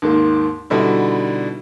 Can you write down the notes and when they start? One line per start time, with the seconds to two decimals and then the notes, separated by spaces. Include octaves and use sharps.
0.02 D#2 G#2 A#3
0.70 B2 D3 G3 D#4 E4